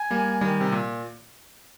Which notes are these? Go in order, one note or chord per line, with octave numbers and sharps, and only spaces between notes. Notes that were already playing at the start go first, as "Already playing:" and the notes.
Already playing: G#5
G3 A#3
D#3 G3
C3
A#2